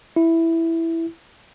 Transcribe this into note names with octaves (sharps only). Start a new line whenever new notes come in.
E4